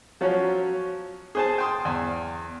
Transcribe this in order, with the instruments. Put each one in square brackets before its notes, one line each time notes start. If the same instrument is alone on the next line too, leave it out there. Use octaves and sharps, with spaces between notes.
[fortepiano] F3 F#3 C#4
G#4 C5 A5
G5 C6 D#6
E2